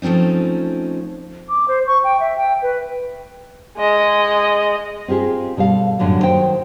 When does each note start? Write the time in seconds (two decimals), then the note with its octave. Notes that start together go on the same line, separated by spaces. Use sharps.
0.02 F3 A3 C4 C#4 D#4
1.49 D6
1.68 C5
1.87 C#6
2.04 G5
2.20 E5
2.38 G5
2.62 B4
3.77 G#3 D#5
5.08 C4 F4 G4 G#4
5.57 B2 G3 A4 F5
5.99 F#2 A2 D3 F#3 G3
6.23 D#3 F#3 C5 G5